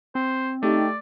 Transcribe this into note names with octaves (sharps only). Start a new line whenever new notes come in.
C4 C5
A3 D#4 G4 D5